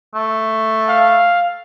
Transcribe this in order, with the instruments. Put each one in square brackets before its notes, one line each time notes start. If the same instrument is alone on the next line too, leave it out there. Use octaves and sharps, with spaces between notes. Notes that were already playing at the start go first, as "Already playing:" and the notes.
[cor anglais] A3
[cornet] F5